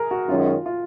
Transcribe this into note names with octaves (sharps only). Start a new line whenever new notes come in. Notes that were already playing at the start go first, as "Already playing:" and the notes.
Already playing: G#4 A#4
F#4
F#2 D#3 G#3 C#4 F4
F4